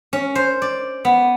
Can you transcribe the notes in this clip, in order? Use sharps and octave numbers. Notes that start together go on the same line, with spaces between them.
C#4
C5
D5
B3